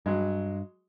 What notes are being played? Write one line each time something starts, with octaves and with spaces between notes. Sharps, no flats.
G2 F#3 G#3